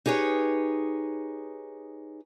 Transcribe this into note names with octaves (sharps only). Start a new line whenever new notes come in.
D#4 G4 G#4 B4 C#5